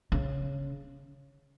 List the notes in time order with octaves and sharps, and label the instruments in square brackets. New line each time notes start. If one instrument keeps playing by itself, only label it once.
[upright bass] C#3